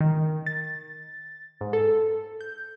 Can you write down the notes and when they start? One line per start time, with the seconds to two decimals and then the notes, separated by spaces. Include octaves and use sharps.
0.01 D#3
0.46 A6
1.61 G#2
1.73 A4
2.41 G6